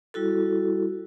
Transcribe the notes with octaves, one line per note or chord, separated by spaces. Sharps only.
G3 E4 F#4 A4